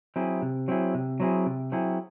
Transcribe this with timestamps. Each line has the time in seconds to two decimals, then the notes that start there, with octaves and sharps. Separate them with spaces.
0.16 F#3 C4 E4 G#4
0.42 C3
0.68 F#3 C4 E4 G#4
0.94 C3
1.20 F#3 C4 E4 G#4
1.46 C3
1.72 F#3 C4 E4 G#4